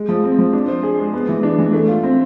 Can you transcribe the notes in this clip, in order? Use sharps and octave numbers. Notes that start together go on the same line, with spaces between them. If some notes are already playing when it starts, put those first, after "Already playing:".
Already playing: G#3
F3
C4
F3
D4
C5
G#4
G#3
B3
E3
D4
E3
A3
F4
C4